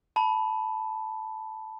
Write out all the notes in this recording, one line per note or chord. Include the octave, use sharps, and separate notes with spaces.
A5 B5